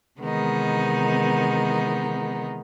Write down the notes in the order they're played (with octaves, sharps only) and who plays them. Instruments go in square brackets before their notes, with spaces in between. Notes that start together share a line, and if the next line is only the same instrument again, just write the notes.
[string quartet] C3 D#3 E3 G#3 B3 D#4